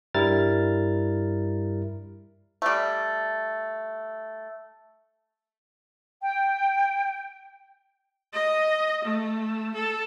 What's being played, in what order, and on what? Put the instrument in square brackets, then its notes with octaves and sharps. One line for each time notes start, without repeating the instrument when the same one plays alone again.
[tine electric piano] G2 G3 E4 A#4 F6 A6
[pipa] G3 A3
[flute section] G5
[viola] D#5
A3
A4